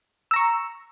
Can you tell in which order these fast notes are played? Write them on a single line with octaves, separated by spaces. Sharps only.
E6 A#5 C#6